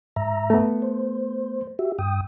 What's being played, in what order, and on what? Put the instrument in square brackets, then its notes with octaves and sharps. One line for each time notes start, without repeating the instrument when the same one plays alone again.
[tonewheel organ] G#2 E5 A#5
[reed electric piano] A3 B3
[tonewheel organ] C5
F#4 G4 E5
G2 G5 D#6